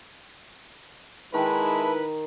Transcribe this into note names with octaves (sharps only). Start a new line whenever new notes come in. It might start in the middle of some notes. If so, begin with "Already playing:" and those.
D#3 G#3 E4 B4 A5